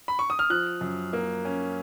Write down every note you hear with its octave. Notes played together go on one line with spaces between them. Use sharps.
B5
C#6
D#6
F6
F3 F#6
F#2
A#3
C#4